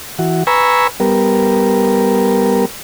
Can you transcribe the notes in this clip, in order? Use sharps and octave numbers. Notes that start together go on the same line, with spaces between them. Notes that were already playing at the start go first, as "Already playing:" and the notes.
E3 F#4
B4 G#5 A#5 B5 C#6 E6
G3 B3 A#4